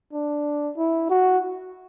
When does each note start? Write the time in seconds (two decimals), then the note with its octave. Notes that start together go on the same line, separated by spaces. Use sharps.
0.13 D4
0.77 E4
1.10 F#4